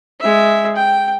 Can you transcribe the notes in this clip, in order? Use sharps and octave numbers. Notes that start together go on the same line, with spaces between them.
G#3 E5
G5